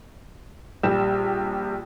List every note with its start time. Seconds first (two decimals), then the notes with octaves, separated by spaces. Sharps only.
0.83 A#1 G3 G4 E7